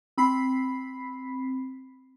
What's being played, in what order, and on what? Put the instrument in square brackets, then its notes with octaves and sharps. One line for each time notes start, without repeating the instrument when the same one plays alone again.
[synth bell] C4 B5 B6 C7